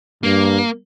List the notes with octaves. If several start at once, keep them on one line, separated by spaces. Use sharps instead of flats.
G2 A#3